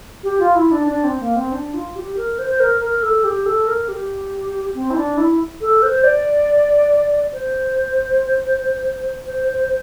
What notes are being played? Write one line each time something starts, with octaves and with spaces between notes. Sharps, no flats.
G4
F4
E4
D4
D4
C4
A#3
C4
D4
F4
G4
A#4
C5
A#4
A#4
A4
G4
A4
A#4
G4
C4
E4
D4
E4
A4
C5
D5
C5
C5
C5
C5